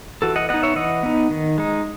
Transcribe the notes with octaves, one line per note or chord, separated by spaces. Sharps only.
E3 F#4 A4
D#5 F#5
B3 D#4 D#5 F#5
C#5 E5
E3 D#5 F#5
B3 D#4
D#3
G#3 D#4